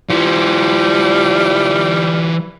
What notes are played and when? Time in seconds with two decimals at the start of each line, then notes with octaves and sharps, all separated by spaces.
0.09 E3 G3 F4